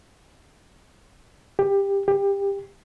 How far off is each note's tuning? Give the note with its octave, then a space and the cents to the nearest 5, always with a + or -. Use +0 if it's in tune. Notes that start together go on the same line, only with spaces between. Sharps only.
G4 +15
G4 +20